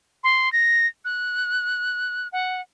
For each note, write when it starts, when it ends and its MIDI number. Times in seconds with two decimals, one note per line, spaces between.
0.24 0.52 84
0.52 0.86 94
1.05 2.28 90
2.32 2.61 78